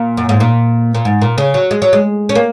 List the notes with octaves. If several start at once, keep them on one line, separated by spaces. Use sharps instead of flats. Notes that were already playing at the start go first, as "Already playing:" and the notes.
Already playing: A#2
F#2
G#2
A#2
A#2
G#2
A#2
C#3
F#3
G#3
F#3
G#3
C#4
A#3